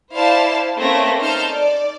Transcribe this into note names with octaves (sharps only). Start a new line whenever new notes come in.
E4 C5 D5 F5 A5
A3 A#3 C4 C#4 B4 A#6
D#4 A4 C5 A5 F6 G6
D5